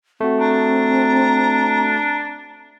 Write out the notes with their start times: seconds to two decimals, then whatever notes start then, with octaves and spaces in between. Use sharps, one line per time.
0.21 A3 C4 F#4
0.40 D4 A#5